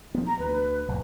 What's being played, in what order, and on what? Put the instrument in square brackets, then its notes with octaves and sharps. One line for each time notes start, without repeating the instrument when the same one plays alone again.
[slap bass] F3 B3
[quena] A#5
[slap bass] D2 [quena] B4
[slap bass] D#1 F2